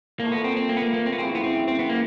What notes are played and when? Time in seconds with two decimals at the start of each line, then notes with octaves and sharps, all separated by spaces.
0.20 A#2 F3 A3 A#3
0.32 B3
0.44 C4
0.57 C4
0.69 A#3
0.77 B3
0.82 A#3
0.94 A#3
1.06 C4
1.12 B3
1.18 F#2 C#3 E3 C4
1.35 B3
1.44 C4
1.68 C4
1.79 B3
1.89 A#3